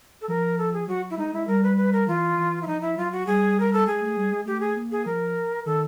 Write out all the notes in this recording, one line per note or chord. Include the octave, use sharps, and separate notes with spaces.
A4
F3 A#4
A4
G#4
F#3 F#4
E4
G#3 D#4
G#3 E4
G3 A#4
B4
B4
A#4
E3 F4
E3
E4
F3 D#4
E4
F#3 F4
F#4
G3 G#4
A#4
A4
G#3 G#4
A3
G3
G#3
A3 G4
G#4
A#3
G#4
F3 A#4
D#3 A4